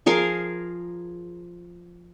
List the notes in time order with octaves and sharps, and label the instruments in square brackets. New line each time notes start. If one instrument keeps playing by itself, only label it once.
[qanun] F3 G#4 A#4 F5